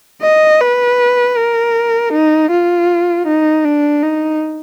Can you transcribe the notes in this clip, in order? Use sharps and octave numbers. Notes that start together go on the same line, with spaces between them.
D#5
B4
A#4
D#4
F4
D#4
D4
D#4